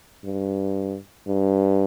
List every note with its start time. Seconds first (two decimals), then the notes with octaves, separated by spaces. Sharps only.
0.24 G2
1.27 G2